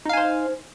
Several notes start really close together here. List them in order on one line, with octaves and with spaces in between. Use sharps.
D#4 F5 G#5 C5